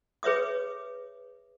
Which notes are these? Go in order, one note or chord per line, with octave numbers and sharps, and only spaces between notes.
G#4 B4 C#5 E5 D#6